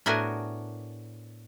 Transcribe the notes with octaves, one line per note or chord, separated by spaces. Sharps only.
A2 B3 D4 F#4 A#4 G#5